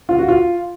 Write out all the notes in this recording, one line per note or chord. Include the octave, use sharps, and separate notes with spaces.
F4
F#4
F4